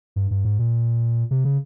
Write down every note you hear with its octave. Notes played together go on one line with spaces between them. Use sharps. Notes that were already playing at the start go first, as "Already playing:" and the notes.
G2
G2
G#2
A#2
C3
C#3